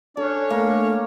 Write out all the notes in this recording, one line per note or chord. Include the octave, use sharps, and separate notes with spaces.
C#4 D4 A4 C#5
A3 A#3